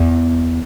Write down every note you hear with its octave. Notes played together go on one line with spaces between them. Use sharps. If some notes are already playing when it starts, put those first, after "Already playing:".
Already playing: E2